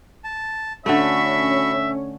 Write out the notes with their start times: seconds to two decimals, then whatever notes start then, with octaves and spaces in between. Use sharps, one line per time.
0.24 A5
0.86 D3 A3 C#4 F#4 E5 B5 C#6